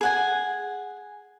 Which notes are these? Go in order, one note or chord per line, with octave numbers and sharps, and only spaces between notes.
G#4 F#5 G#5